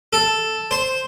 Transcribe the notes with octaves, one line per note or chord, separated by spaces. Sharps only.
A4
C5